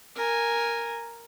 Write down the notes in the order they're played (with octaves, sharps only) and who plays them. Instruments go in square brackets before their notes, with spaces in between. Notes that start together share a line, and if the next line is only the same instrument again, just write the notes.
[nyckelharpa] A#4 G#5